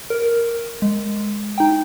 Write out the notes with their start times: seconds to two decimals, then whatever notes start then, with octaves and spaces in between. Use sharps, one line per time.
0.10 A#4
0.82 G#3
1.58 D#4 G5